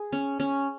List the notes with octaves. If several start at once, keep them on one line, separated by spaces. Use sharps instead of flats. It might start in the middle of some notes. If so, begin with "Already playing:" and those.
Already playing: G#4
C#4
C#4